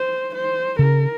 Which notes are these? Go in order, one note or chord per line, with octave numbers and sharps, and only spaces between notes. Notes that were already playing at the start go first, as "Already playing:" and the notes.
Already playing: C5
C5
C#3 A#4